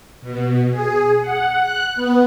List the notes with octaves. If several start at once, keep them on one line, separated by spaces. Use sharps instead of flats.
B2
G#4
F#5
F#6
B3